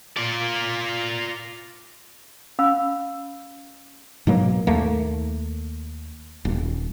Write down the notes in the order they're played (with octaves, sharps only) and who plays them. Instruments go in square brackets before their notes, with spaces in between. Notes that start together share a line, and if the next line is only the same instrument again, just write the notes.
[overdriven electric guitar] F4 D5
[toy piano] C#4 F5 B5 E6
[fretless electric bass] G#2 B2 F#3 A#3
D#2 A3 A#3
D#1